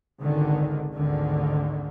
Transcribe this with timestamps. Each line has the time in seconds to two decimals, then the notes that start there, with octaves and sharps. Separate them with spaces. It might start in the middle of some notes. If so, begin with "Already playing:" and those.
0.21 G#1 C#2 D3 D#3
0.93 G#1 D2 D3 D#3